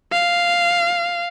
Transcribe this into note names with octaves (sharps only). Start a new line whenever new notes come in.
F5